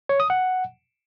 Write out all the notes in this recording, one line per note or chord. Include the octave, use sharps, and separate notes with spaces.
C#5
D#6
F#5